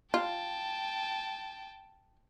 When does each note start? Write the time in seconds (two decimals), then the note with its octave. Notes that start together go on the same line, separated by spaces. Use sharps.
0.14 F4 G5 A5